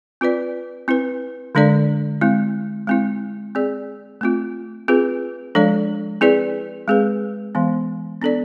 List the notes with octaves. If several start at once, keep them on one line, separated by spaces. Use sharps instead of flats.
C4 F4 B4 D5
C4 E4 B4
D3 G#3 D4 A4 D5
G#3 C4 E4
G#3 C4 E4
C4 G#4 D5
A3 C4 F4
C4 F4 G#4 B4
F3 G#3 D4 A4 D5
C4 E4 G#4 B4 D5
G#3 C4 G#4 B4
E3 G#3 B3
B3 D4 A4 D5